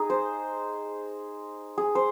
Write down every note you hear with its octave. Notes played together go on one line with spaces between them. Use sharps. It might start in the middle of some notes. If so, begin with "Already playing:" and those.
Already playing: D#4 G#4
C5
G#4
C5